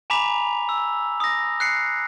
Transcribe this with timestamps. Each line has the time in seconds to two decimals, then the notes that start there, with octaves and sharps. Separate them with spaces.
0.10 G#5 A#5 B5 D6 B6 F7
0.69 E6
1.20 D#6 A#6
1.60 F#6 C7 C#7